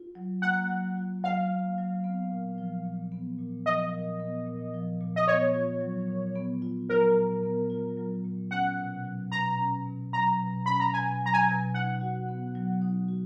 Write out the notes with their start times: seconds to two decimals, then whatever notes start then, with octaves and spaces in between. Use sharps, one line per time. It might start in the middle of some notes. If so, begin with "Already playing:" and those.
Already playing: F4
0.15 F#3
0.42 A#3 F#5
0.69 F#3
0.97 F4
1.24 F#3 F5
1.50 A#3
1.78 F#3
2.04 B3
2.31 A#2
2.58 F3
2.85 A#2
3.12 B3
3.39 A#2
3.66 F3 D#5
3.93 A#2
4.20 B3
4.47 A#2
4.74 F3
5.01 A#2
5.16 D#5
5.27 B3 C#5
5.54 F4
5.81 F#3
6.08 A#2
6.36 B3
6.62 F4
6.89 F#3 A#4
7.16 A#2
7.43 B3
7.70 F4
7.97 F#3
8.24 A#2
8.51 C#4 F#5
8.78 B2
9.05 F#3
9.32 B2 A#5
9.59 C#4
9.86 B2
10.13 F#3 A#5
10.39 B2
10.66 C#4 B5
10.80 A#5
10.93 B2 G#5
11.21 F#3
11.26 A#5
11.34 G#5
11.47 B2
11.74 D#4 F#5
12.01 F#4
12.29 B3
12.55 F#3
12.82 D#4
13.09 F#4